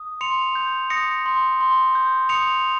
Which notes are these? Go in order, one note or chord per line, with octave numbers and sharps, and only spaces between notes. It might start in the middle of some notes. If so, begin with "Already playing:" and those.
Already playing: D#6
C6 C#7 F7
G6
D#6 A#6 C#7
C6
C6
G6
D#6 C#7 F7